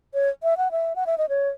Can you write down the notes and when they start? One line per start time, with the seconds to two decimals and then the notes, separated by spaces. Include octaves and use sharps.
0.14 C#5
0.43 E5
0.57 F#5
0.72 E5
0.96 F#5
1.07 E5
1.18 D#5
1.29 C#5